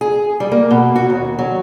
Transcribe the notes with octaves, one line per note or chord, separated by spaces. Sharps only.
G#4
G3
A#3
B2
F#4
D#2
F#3